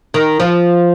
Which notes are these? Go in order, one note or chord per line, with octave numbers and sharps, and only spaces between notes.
D#3
F3